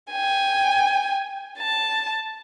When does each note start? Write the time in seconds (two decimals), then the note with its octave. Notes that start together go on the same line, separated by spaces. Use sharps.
0.12 G5 G#5
1.59 A5